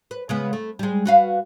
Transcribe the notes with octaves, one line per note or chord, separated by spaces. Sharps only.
B4
C#3 G#3 B3
A3
G3 G#3
F#4 B4 F5